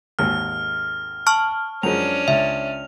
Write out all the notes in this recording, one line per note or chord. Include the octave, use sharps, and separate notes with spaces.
G#1 D#2 G#2 F6
A5 C#6 F6
F#2 F3 G#3 C#4 D4 F7
C#2 E5